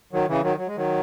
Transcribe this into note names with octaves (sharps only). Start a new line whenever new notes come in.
D#3 F#3
C#3 E3
D#3 F#3
F#3
G#3
D#3 F#3